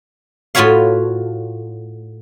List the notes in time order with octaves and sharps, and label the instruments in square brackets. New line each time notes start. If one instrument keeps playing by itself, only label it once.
[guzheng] A2 F4 F#4 B4 C#5 F5